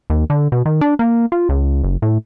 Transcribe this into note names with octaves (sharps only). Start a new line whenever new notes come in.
D#2
D3
B2
D#3
D4
A#3
F4
C#2
F#1
A2